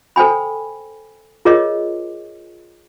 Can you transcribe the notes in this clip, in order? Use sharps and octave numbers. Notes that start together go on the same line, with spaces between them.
A4 C5 G5 G#5 B5
F4 G#4 A#4 C#5 D#5 D6